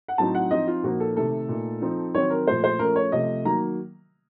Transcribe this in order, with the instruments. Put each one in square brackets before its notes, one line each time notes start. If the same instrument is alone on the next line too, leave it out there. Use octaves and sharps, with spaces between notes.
[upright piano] F#5
A2 F#3 C4 D#4 A5
F#5
F3 C4 D#4 D#5
F4
A#2 F3 A#3 D#4 F#4
A4
C3 D#3 A3 A4
A#2 A3 D#4
F3 C4 D#4
D#3 F#3 C4 C#5
A#4
A#2 F3 A3 C5
C5
F3 A3 C#4 A#4
C#5
C3 F3 A3 D#5
D#3 F#3 A#3 A#5